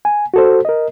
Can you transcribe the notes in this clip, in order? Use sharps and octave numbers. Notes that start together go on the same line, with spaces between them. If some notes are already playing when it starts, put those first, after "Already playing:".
G#5
F#4 A4 C5
A#4 D#5